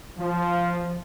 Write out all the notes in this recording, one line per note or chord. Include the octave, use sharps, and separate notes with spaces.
F3